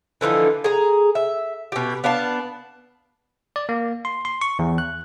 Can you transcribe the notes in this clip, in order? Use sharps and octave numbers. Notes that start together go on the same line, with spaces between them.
D3 E3 F3 D#4
G#4 A#5
E5
B2 G4
B3 D4 F5 A5
D5
A#3
C6
C6
C#6
E2
F#6